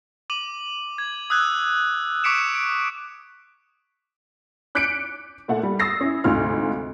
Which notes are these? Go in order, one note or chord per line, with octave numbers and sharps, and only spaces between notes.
D6 D#7 F#7
G#6
D#6 E6 F#6 G#6
C#6 D6 B6 C#7 D7 E7
D7
D6 F#6 G6 B6 C#7 D7
A#2 A3 F#5
G3
D#6 E6 A6 A#6 C7
C#4 E4
D2 G#2 C3 F4 F6